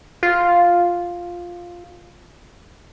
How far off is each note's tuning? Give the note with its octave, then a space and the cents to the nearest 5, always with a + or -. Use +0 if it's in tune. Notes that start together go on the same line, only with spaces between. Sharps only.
F4 +5